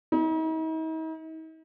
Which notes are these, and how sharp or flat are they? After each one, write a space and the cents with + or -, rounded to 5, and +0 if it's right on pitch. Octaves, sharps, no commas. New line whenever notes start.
D#4 +45